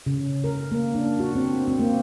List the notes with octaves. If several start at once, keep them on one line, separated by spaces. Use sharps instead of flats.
C#3
A#4
A#3
D4
F#4
C4
C4
A#3